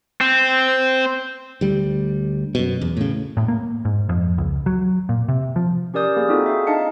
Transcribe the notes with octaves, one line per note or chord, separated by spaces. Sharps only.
C4
D2 G3
F#2 B2
E2
A2 C#3
A2
A#3
G#2
F2
C#2
F#3
A#2
C3
F3
C#4 G4 A#4 D5 D#6 G6
A#3 G#4
C4 D#4 F4 F#4 G#4 A4
E5 F5
D4 D#4 D#5 F5 A5 C#7